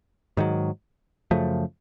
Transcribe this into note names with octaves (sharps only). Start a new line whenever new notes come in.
G#2 D#3 F#3
F#2 C#3 F3 A3